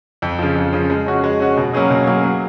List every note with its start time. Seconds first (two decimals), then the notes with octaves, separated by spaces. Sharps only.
0.22 F2
0.39 C#3 F3
0.56 F2
0.73 C#3 F3
0.90 G#3
1.06 C#4 F#4
1.24 G#3
1.40 C#4 F#4
1.57 B2
1.73 F#3 A#3 C#4 G#4
1.90 B2
2.07 F#3 A#3 C#4 G#4
2.24 F#3